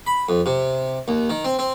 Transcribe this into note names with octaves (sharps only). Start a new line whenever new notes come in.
B5
F2
C3
D#2
D#3
C4
C4